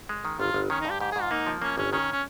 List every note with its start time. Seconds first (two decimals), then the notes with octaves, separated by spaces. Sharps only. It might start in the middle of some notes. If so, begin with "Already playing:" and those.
0.09 G#3
0.25 D#3
0.39 G1 F4
0.54 G1
0.70 D#3 C#4
0.81 D#4
0.85 G2
0.90 G4
1.00 G#2 G4
1.12 G#4
1.16 G#2
1.22 F4
1.31 A#3 D#4
1.47 F3
1.62 A#3 C#4
1.78 G1 C#4
1.92 D#3 C#4
2.11 C#4